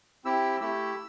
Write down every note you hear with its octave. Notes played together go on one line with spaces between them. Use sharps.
C4 E4 G4 E6
A3 E4 G4 E6